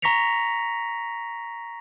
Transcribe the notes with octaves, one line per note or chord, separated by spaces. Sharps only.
A#5 C#6 A#6 B6 C#7 F7